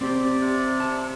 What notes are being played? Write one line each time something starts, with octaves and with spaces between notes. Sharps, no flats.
C4 G4 D5
C3
A5